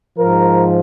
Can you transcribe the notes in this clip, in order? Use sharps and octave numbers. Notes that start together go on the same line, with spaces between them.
G#2 F3 A#4